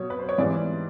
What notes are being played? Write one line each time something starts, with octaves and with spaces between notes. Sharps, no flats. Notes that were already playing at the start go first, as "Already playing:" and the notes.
Already playing: B2 F#3 C#5
B4
C5
C#5
G#2 E3 G3 D5